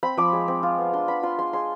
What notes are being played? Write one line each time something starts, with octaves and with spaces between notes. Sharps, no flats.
C4 B5
F3 D6
G#3
C4
F4
B3
D4 C6
B3 B5
F4 C6
G#3 C6
G#3 C6